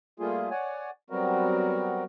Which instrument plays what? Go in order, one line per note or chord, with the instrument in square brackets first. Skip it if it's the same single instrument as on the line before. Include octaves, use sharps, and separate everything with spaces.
[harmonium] G3 A3 A#3 F4 G#4
C#5 D5 F#5 G#5
F#3 G3 B3 C4 F#4 A#4